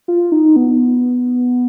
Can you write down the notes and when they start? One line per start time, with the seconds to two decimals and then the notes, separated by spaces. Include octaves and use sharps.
0.08 F4
0.32 D#4
0.56 B3